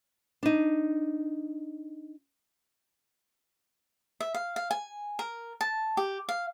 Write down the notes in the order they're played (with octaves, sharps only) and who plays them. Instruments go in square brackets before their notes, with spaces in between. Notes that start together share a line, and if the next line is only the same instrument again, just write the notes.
[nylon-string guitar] D4 D#4
[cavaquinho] E5
F5
F5
G#5
A#4
A5
G4
F5